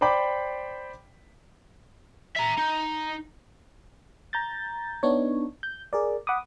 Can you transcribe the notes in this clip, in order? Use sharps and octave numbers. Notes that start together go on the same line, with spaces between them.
C5 D5 G5 B5 D6
E5 A#5
D#4
A#5 G6 A6
B3 D4 D#4 C#5
G6
G#4 A#4 D5
F#5 B5 D6 D#6